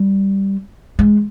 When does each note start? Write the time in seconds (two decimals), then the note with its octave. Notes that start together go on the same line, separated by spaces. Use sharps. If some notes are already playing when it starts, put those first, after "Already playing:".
Already playing: G3
0.99 G#3